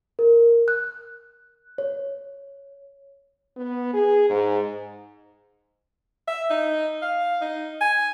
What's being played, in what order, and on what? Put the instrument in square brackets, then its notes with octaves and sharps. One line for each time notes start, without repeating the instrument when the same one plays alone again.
[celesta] A#4
F#6
C#5
[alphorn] B3
G#4
G#2
[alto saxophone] E5
D#4
F5
D#4
G#5